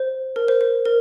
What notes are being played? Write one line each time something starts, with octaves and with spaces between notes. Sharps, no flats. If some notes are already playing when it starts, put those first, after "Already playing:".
Already playing: C5
A#4
C5
C5
A#4